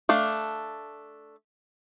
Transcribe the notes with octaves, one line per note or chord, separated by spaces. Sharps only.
A3 D4 F5